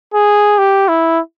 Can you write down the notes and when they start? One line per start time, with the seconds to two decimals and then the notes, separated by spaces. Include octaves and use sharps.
0.14 G#4
0.58 G4
0.88 E4